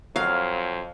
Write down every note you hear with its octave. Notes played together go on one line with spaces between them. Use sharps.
F2 F#3 F5